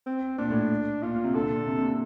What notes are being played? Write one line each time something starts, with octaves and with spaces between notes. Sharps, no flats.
C4
A#2 D4
A2
A#2 F4
A#2
C3
D3 A4
A#2
A#2
C3
C3
A#2